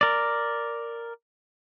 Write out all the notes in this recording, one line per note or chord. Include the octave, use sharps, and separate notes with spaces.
A#4 D5